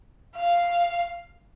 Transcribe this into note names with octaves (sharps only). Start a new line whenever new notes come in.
F5